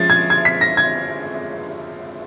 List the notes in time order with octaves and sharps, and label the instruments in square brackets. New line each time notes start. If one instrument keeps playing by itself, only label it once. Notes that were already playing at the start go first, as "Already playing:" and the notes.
Already playing: [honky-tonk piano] F3 G#3 C#4 A6
G#6
G#6
B6
A#6
G#6